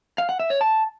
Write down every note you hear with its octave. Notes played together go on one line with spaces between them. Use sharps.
F5
F#5
E5
C#5
A5